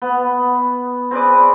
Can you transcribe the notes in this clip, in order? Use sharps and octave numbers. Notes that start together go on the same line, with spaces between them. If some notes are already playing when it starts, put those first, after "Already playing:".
B3
C4 G#4 B4 D5